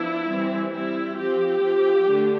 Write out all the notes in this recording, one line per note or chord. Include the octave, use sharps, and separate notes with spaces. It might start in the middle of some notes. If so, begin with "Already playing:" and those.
Already playing: F3 B3 D4 E4
E3 G3 C4
G3 C4 E4
F3 C4 G4
F3 C4
D3 A3 D4